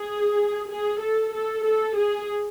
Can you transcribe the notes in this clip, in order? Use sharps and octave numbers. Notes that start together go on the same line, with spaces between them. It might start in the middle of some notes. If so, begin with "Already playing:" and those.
Already playing: G#4
G#4
A4
A4
A4
G#4